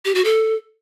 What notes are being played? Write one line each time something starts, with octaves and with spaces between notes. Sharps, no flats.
G4
F#4
A4